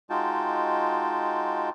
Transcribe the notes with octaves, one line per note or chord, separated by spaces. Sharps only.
G#3 D#4 F4 F#4 G5 A5